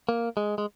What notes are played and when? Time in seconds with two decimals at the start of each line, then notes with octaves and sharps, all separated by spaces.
0.09 A#3
0.37 G#3
0.58 G#3